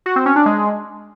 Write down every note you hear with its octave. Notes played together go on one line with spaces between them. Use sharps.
F#4
C4
C#4
D4
G#3